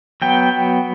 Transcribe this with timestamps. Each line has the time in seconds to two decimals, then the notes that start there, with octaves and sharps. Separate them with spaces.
0.22 F#3 B3 G5